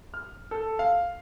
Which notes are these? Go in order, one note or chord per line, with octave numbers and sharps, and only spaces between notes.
F6
A4
F5